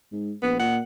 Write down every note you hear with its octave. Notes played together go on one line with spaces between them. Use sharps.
G#2
A#1 B3
A#2 F#5